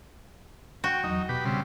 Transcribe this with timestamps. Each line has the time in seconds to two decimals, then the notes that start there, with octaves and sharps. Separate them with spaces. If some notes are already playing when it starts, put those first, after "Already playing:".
0.84 F#4 G5
1.04 E2 F#3 D#4 D#5
1.29 B2 G4 B4
1.45 C#3 G3 C4